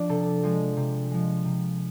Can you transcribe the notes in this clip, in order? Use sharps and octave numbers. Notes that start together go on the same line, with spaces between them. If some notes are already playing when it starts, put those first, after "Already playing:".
Already playing: F3 D4 D5
C3 A4
F3 G#3
C3
F3 G#3
C3